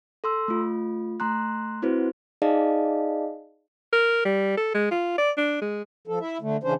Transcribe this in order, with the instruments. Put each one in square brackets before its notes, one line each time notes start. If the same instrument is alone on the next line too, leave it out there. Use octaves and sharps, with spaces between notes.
[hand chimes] A4 C6 E6
A3 F4
A3 A#5 C6 F#6
C4 E4 F#4 B4 C5
D#4 G#4 D5 D#5 F5 A5
[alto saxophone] A#4
G3
A4
G#3
F4
D5
D4
G#3
[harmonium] F3 A4
E4 E5
D3 A3
C#3 E3 C#4 D4 C5